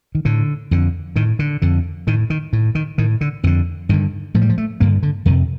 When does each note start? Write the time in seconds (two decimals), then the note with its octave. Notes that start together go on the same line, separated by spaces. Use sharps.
0.15 D#3
0.25 A2 D3
0.71 F2 D3
1.16 A2 D#3
1.39 D3
1.62 F2 D3
2.07 A2 D#3
2.30 D#3
2.53 A2
2.75 D#3
2.98 A2 D#3
3.21 D3
3.43 F2 D#3
3.47 D3
3.89 G2 D3 D#3
4.34 A2 F3
4.42 G3
4.49 F3
4.58 A3
4.80 G2 D3 A#3
5.03 D3
5.26 F2 D#3
5.29 C3